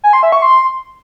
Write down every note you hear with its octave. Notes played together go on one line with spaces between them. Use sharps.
G#5
C6
E5
C#6
C6